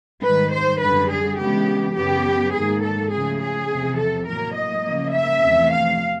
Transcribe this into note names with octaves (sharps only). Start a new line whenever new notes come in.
G#2 D#3 G3 B4
C5
F#2 D3 G3 B4
G#4
C#3 E3 G#3 B3 G4
F#2 C#3 F#3 B3 G4
G#2 D#3 F#3 A#3 G#4
A4
C#3 F3 A3 G#4
G#4
E2 C3 F3
A4
A2 F#3 A#3 A#4
D#5
C#3 F3 A#3
E5
E2 C3 F3 A3
F5